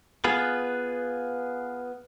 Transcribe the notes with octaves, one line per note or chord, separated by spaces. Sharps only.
B3 F4 G#4 B4